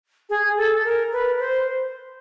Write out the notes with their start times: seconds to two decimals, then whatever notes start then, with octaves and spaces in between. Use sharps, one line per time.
0.29 G#4
0.57 A4
0.84 A#4
1.12 B4
1.40 C5